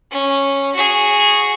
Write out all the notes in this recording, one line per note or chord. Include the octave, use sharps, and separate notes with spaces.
C#4
F#4 G#4